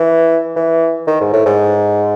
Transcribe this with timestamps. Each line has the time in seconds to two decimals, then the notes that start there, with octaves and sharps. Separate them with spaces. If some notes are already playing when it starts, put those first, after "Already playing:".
Already playing: E3
0.56 E3
1.07 D#3
1.21 G#2
1.33 A2
1.46 G#2